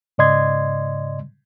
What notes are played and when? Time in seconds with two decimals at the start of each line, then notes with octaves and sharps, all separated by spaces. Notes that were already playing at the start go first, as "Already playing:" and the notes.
0.18 G#2 C#3 D5 D#5 C6 G#6